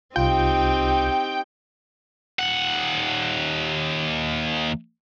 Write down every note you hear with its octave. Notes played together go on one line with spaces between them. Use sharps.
C2 C4 D#4 F4 G4 G5
D#2 F#5